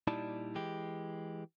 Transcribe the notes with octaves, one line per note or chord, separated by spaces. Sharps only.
A#2 G3 D#4 E4 D5 A5
E3 G#3 G4